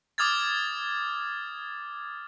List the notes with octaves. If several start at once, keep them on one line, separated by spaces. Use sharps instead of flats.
D6 D#6 F6 G#6 A6